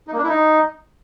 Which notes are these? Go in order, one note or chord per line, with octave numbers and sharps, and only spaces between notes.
D#4
A#3
D4
E4
D#4